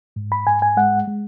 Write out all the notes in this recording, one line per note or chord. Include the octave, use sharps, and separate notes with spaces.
G#2
B5
G#2 G#5
G#5
G#3 F#5
G#3